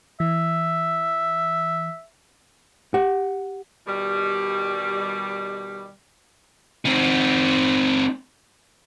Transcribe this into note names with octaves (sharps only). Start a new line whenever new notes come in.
E3 E5
G4 F#5
B2 D#3 G3
C4 D#4